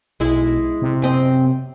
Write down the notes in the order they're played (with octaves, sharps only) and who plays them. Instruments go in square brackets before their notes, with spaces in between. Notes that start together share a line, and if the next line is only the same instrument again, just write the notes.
[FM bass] B1 [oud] G#3 E4
[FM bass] C3
[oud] F#2 C4 D#5